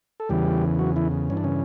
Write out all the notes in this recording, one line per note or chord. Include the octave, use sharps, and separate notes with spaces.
A4
E2 C#3 E3 G3 G4
F#3 F#4
E3 E4
G2 E3 C#4
D4
C#3 C#4